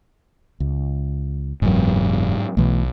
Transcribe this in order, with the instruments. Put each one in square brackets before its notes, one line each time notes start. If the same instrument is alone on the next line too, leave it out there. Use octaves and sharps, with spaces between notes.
[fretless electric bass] C#2
[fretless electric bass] F#1 E2 [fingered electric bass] G#2 F#3
[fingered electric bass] B1 [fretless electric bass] B2 E3 A3